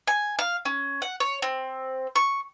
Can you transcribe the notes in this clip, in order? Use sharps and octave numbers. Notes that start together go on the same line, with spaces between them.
G#5
F5
C#4
F#5
C#5
C4
C#6